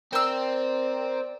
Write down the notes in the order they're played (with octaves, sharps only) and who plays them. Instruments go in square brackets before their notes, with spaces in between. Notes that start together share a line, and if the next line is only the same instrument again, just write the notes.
[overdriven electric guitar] C4 [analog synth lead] A#4 [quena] D5 [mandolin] G5 E6